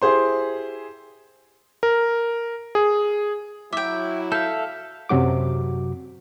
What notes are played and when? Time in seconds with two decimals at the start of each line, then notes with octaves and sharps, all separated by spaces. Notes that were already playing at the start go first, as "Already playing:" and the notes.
0.02 E4 G4 G#4 C5 C6
1.83 A#4
2.75 G#4
3.73 F#3 E4 E5 G5 D6
4.32 A4 E5 F5 G6
5.09 F#2 C3 F#3 F#4 D6